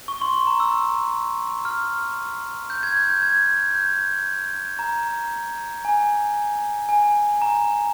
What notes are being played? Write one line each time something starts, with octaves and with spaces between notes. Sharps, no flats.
C#6
C6
C6
A#5
E6
F6
G6
G#6
G6
G6
G#6
G6
A#5
G#5
G#5
A#5